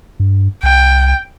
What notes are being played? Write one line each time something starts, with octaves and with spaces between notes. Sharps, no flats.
G2
C2 G5